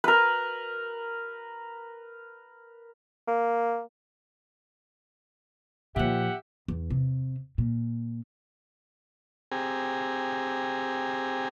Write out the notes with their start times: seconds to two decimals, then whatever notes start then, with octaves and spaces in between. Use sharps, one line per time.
0.04 A#4 B4
3.27 A#3
5.96 A#2 F3 G4 E5 F#5
6.68 E2
6.90 C3
7.58 A#2
9.52 C4 G4 G#4 G#5 A#5